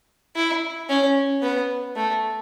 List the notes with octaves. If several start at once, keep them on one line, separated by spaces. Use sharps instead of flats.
E4
C#4
B3
A3